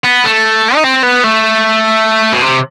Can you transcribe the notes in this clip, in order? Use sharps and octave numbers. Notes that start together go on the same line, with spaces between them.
B3
A3
D#4
C4
B3
A3
B2
C3